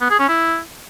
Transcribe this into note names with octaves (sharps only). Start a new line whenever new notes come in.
B3
G#4
C#4
E4